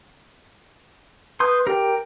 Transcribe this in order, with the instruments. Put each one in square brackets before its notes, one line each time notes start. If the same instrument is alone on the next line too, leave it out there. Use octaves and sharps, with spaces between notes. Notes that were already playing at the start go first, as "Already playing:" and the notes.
[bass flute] B4 [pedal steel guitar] C6 D#6 G6
[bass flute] G4 [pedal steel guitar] A#4 G5